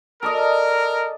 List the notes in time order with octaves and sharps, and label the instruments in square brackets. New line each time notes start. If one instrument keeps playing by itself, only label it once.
[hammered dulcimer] A4 D5 D#5 [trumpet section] A#4